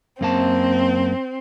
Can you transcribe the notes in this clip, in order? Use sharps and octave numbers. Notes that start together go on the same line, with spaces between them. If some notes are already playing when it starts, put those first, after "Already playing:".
F#2 A#3 C4 A5